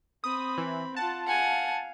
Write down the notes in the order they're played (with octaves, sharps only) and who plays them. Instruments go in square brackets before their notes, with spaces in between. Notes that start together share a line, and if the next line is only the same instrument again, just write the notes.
[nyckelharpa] C4 B5 [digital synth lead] D#6
[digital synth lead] E3
[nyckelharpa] F4 F#5 [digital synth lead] A5
[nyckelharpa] F5 [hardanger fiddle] F#5 G#5